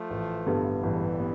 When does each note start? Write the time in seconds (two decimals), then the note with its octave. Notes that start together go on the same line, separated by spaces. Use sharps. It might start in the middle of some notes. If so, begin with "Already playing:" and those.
Already playing: F3 A3
0.10 A1
0.46 G2 D3 G3 B3
0.83 A1 E3 G3
1.19 B3